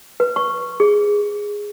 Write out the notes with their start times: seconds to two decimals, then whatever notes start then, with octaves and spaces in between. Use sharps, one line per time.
0.20 B4
0.36 C#6
0.80 G#4